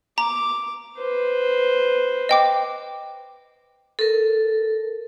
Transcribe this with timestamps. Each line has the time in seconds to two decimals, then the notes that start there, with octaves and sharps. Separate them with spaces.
0.18 A#5 D6
0.98 B4 C5
2.29 D#5 G5 D6
3.99 A4 A#4